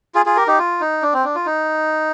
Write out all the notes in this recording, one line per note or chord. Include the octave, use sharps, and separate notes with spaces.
F4 G#4
F4 G#4
G4 A#4
D#4 G4
F4
D#4
D4
C4
D4
F4
D#4